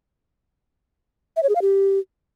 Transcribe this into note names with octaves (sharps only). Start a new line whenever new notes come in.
E5
C#5
G#4
F5
G4